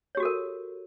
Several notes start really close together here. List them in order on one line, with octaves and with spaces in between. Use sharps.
C#5 G4 F#4 A4 A#4